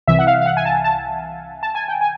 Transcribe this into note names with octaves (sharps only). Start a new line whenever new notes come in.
C2 C3 E3 E5
F#5
F5
F5
F#5
G#5
A5
A5
A5
G#5
G5
G#5